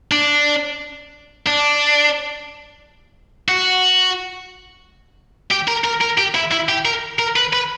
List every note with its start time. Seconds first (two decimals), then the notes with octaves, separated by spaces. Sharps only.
0.12 D4
1.46 D4
3.49 F#4
5.51 G4
5.68 A#4
5.84 A#4
6.01 A#4
6.18 G4
6.35 E4
6.52 E4
6.69 G4
6.86 A#4
7.19 A#4
7.36 B4
7.53 B4